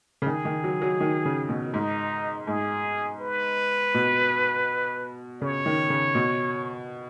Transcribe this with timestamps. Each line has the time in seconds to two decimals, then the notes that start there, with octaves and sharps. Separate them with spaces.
0.22 C#3
0.26 D#3 G#4
0.45 D#3
0.64 F#3
0.82 F#3
1.01 D#3
1.25 C#3
1.49 B2
1.73 G#2 D#4
2.47 G#2 G#4
3.21 B4
3.95 B2
5.42 C#3 C#5
5.66 D#3
5.90 C#3
6.15 B2